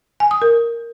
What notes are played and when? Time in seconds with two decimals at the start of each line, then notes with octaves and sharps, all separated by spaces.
0.20 G#5
0.31 D#6
0.42 A#4